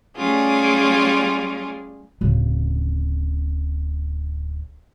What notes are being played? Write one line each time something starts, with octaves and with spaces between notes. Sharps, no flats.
G3 A3 C#4 F4 G#4
D1 C#3